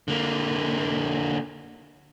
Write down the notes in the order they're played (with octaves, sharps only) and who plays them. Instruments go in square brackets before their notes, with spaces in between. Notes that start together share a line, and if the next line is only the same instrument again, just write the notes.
[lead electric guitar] D3 A#3